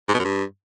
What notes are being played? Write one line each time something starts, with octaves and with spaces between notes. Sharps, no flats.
G#2
B2
F#2
G2